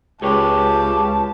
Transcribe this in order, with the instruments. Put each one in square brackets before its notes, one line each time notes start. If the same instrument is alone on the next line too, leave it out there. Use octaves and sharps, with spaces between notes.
[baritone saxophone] C#2 [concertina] G4 [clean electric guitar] G#4 B4 C#5 [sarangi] A5